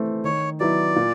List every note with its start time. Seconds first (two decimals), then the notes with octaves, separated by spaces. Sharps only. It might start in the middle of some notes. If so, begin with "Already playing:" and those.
Already playing: E3 A3 C4
0.24 D#3 C#5
0.60 F#3 B3 E4 D5
0.96 A#2